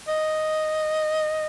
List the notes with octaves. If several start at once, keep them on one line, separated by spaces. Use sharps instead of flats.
D#5